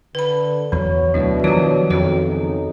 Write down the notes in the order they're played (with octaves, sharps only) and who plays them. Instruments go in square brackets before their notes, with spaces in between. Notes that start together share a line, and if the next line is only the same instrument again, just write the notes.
[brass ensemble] D3 [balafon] B4 B5
[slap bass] E2 [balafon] E3 [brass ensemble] F#3 C#5
[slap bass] D2 [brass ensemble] B2 D4 E4 [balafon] F#3
[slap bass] D#3 F3 [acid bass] F#3 [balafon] F4 G4
[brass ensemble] B1 [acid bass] F2 [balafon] F#4 C#5
[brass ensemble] B1 C#3 D#4